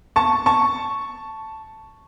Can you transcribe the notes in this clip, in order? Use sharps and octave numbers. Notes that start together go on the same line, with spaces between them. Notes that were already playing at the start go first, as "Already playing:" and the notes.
A5 C#6
A5 C#6